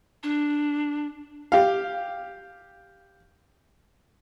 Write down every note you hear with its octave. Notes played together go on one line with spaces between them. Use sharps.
D4
G4 F5